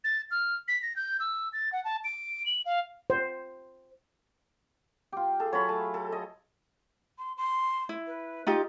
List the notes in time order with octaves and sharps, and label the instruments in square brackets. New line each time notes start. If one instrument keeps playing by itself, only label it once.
[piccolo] A6
F6
B6
A#6
G6
E6
A6
F#5
A5
D7
F#7
F5
[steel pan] C5
[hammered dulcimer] F4 G4
[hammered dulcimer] G#4 [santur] A4
[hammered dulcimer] F#3 F4 [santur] C#5 A5 B5
[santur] A3
A4
D#5
[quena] C6
C6
[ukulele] E4
[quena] B4
[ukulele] D#4 F4 G4 [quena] D#5